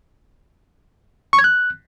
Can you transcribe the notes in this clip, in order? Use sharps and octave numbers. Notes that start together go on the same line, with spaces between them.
C#6
G#6
F#6